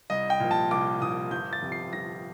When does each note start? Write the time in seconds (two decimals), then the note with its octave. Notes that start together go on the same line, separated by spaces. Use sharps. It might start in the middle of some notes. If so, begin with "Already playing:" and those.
0.10 C2 D#5
0.30 G5
0.40 A#2 F3
0.51 A5
0.71 C2 D6
1.01 A#2 F3 D#6
1.31 G1 G6
1.53 A6
1.62 F2 C3
1.72 C7
1.93 G1 A#6